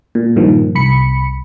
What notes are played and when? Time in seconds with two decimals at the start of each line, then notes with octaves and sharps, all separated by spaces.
0.15 A#2
0.36 G2 A#2 D#3 F3
0.75 C2 B5 C#7